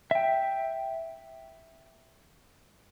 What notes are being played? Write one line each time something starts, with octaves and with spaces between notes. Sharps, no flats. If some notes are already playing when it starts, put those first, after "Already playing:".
E5 G5